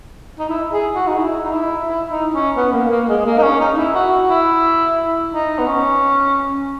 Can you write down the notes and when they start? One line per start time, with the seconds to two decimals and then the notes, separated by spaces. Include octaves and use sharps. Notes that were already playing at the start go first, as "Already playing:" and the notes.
0.39 D#4
0.49 E4
0.72 G#4
0.95 F#4
1.07 D#4
1.17 E4
1.44 D#4
1.53 E4
1.87 E4
2.10 D#4
2.34 C#4
2.56 B3
2.73 A#3
2.91 A#3
3.08 G#3
3.25 A#3
3.38 D#4
3.43 C#4
3.60 D#4
3.77 E4
3.95 F#4
4.29 E4
5.33 D#4
5.58 B3
5.67 C#4